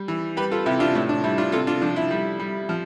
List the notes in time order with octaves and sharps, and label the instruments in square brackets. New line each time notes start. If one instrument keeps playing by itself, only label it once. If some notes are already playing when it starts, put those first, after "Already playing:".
Already playing: [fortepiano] G3
E3
G3 G4 B4
F4 A4
C3 E4 G4
D4 F4
A2 E4
D4
G3 E4
D4 F4
C3 F4 A4
D4 F4
F3 D4
E4
G3
G3
F3